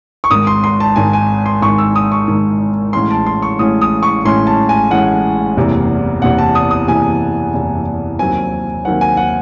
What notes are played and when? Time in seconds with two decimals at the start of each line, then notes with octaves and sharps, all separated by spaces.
0.24 C#6
0.30 G#1 G#2 D#3 D#6
0.47 C6
0.64 C6
0.80 A5
0.96 G#1 G#2 D#3 G#5
1.13 G#5
1.46 C6
1.61 G#1 G#2 D#3 C#6
1.78 E6
1.96 D#6
2.12 C#6
2.28 G#1 G#2 D#3
2.93 A1 A2 E3 G#3 C#4 C6
3.11 A5
3.26 C6
3.42 C#6
3.59 A1 A2 E3 G#3 C#4 D#6
3.81 D#6
4.03 C#6
4.24 A1 A2 E3 G#3 C#4 C6
4.47 A5
4.69 G#5
4.90 A1 A2 E3 G#3 C#4 F#5
5.57 F#1 E2 C3 E3
6.22 F#1 E2 C3 E3 F#5
6.38 A5
6.55 D#6
6.71 D#6
6.87 F#1 E2 C3 E3 G#5
7.54 F#1 E2 C3 E3
8.19 D#2 D#3 F#3 C4 G#5
8.85 D#2 D#3 F#3 C4 F#5
9.01 G#5
9.17 F#5